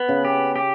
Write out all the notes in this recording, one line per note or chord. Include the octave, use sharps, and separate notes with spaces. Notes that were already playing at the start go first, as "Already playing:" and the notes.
Already playing: B3
C#3
G4
G4